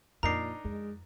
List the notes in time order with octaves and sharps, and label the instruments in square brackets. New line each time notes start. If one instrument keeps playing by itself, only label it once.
[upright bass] F2 [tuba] A#2 [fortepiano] D4 D#4 A#4 [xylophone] A#5 C7
[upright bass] F2 [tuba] G#3